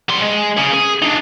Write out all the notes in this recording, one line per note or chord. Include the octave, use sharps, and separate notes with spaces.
G3 C6
G#3
C#4 G#4
G#4
D4 D#4